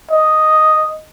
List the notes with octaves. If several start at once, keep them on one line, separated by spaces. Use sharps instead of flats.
D#5